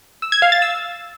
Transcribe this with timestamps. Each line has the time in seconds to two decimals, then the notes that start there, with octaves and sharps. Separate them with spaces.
0.22 E6
0.32 G#6
0.42 F5
0.52 A6
0.62 E6